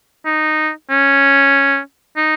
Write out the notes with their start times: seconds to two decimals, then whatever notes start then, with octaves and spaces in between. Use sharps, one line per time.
0.26 D#4
0.90 C#4
2.17 D#4